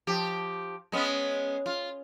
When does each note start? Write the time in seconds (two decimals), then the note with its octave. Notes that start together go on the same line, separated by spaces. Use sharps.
0.07 F3 G4
0.92 G#3 B3 C#4
1.66 F4